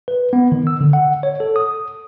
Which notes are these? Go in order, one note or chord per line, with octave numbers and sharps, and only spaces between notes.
B4
B3
D#3
E6
D3
F#5
C#5
A4
D#6